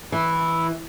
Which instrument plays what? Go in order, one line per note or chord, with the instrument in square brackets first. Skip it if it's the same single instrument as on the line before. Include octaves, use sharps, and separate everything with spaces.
[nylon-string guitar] E3 [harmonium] E4